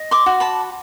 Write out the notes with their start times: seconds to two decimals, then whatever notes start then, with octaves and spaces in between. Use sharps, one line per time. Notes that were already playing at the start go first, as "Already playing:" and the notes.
Already playing: D#5
0.11 C6 D6
0.26 F#4
0.40 A5 B5